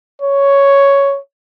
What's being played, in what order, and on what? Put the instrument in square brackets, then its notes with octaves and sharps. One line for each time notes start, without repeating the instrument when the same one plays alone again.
[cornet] C#5